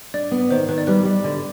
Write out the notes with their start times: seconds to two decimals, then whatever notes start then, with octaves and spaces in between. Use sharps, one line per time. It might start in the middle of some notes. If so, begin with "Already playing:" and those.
0.14 D4 D5
0.31 B3
0.51 D#3 C5
0.69 D#3 B4
0.78 D5
0.87 G3 B4
1.05 G3
1.24 D3